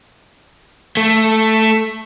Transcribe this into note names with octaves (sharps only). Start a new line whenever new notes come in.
A3